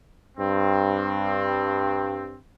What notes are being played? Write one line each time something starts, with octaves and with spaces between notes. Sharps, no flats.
G2 C4